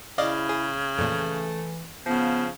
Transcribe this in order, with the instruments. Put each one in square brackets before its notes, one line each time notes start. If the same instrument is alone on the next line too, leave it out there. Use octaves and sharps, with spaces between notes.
[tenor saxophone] C#3 [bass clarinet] E4 [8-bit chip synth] D5 D#5 F5
[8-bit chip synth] G#4
[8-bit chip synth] F2 A#2 [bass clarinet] E3 [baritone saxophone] A3
[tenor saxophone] C#3 [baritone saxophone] F3 [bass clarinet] B3